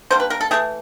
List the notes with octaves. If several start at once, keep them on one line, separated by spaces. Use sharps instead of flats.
D3 G3 A#3 C5
B4
A#4
A4
E3 A3 G#4